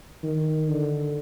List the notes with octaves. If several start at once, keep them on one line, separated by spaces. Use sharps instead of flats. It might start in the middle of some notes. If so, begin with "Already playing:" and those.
D#3
D3